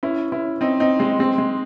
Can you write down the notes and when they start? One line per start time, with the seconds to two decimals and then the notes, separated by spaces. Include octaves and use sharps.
0.03 C#4 E4
0.32 C#4 E4
0.61 C4 D#4
0.80 C4 D#4
0.99 G#3 C4
1.19 G#3 C4
1.38 G#3